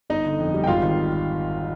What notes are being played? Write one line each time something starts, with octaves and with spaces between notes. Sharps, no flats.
G1 D#4 D#5
D3
F2
G3
G5
G#1 F4 F5
D#3